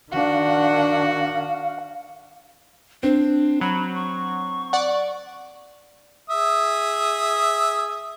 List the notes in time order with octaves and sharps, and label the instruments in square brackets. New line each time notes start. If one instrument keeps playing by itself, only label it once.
[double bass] D#3 D4 [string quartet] F#4 F#5 [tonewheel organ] F5
[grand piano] C4 [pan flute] D4
[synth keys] F#3 [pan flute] B5
[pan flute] C#6
[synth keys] D5 F#5
[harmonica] G#4 E5 D#6